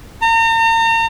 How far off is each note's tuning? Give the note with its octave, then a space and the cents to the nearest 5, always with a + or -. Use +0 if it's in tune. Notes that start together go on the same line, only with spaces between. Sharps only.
A#5 -40